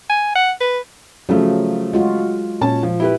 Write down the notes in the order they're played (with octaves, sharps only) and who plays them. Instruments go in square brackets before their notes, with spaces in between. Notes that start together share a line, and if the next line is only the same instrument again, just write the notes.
[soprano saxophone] G#5
F#5
B4
[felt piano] C#3 F3 A3 [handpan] F#3
[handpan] G#3 F4 F#4
[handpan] A#2 [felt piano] C#4 A5
[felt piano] F3
E4 G4 B4